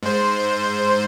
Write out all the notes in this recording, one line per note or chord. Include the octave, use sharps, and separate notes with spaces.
G#2 C5